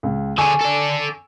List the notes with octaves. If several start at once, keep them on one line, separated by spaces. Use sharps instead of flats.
C#2
D3 G#4 G#5 C#6 E6
A4 D5